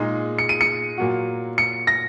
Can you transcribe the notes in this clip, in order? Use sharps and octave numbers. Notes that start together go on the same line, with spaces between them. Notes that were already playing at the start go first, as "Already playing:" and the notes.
Already playing: A#2 G#3 D#4 G#4
C#7
D#7
C#7
A#2 F#3 A#3 F#4
C#7
A#6